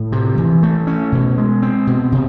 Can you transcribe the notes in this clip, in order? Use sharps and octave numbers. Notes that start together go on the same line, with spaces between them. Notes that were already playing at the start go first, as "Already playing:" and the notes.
Already playing: A2
C3
E3
A3
C#4
B2
G#3
C4
B2
C3